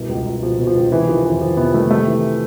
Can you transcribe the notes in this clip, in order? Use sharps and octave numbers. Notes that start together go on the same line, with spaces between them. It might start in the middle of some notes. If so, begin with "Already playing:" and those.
Already playing: C2 B2
C#2
C#2
B2 F3
B2
F3
C#2
C3 E3
D#3 F3
F2 E3
F2 F3
C3 B3
D#3 A3
C3 A3
E3